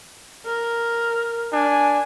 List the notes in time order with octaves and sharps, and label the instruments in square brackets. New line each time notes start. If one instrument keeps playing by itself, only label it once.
[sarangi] A#4
[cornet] D4 [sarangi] G#5